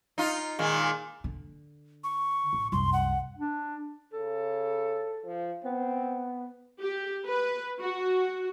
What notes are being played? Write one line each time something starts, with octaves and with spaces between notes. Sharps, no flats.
D#4 F4
A#2 D#3 G#3
D3
C#6
A1
C2 F#2 C6
F#5
D4
C#3 A4
F3
B3 C4
G4
B4
F#4